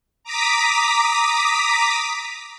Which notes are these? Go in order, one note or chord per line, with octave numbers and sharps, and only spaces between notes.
A#5 D6 D#6 B6